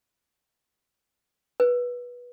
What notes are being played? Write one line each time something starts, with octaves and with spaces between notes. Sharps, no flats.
B4